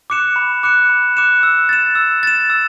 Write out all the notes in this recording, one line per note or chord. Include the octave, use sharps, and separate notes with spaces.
D6 F#6 C#7 E7
B5
D6 F#6 C#7 E7
B5
D6 F#6 C#7 E7
E6
A6 E7
E6
A6 E7
E6